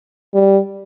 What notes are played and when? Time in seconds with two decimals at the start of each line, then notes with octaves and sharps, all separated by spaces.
0.34 G3